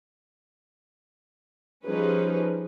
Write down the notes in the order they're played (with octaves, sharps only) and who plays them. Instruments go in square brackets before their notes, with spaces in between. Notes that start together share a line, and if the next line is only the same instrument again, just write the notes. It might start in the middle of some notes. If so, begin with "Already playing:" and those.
[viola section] F3 G3 C#4 D#4 G#4 B4